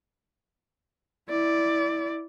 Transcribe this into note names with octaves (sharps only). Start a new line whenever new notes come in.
E4 D5